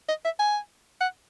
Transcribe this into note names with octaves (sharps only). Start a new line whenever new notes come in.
D#5
E5
G#5
F#5